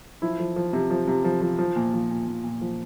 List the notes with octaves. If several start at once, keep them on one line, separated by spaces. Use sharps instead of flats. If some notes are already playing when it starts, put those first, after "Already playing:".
F3 E4
F3
F3
C3
F3
C3
F3
F3
F3
A#2
F3
A#2
A#2
A#2
F3